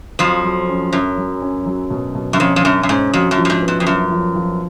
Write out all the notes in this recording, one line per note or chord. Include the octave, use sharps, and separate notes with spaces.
F2 F3 F#3
F#3
C#4
F#2 C#4
F#3
C#4
F#3
B2
B2
F#2
F2 C#4
F2
F#2 C#4
F#2
G#2 C#4
F2 F#4
F#2
F3
F#2
G#2
B3
G#2
F2
F#2 F3
F3
F3